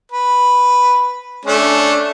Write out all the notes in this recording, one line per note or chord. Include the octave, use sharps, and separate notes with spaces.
B4
A3 C#4 D4